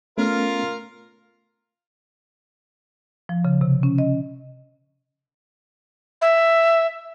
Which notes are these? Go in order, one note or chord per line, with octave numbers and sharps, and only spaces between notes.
A3 B3 C#4 F4 A#4
F3
C#3
C3
C#4
D#5
E5